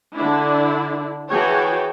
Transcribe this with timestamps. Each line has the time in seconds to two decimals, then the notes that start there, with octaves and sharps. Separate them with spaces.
0.14 D3 D4 E4
1.30 E3 F#4 G#4 C#5 G5 A5